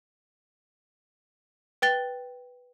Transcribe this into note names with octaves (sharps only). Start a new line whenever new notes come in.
B4 G5 A6 G7